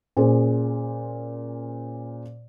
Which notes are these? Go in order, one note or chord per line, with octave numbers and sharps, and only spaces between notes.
A#2 C#4 G#4 C5